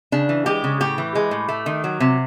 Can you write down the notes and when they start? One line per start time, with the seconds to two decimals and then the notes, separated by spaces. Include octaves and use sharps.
0.12 C#3 D4
0.29 E3
0.46 G#3 G4
0.64 C#3
0.80 A2 G4
0.98 E3
1.15 G#3
1.31 A2
1.48 A3
1.66 D#3
1.84 F#3
2.00 C3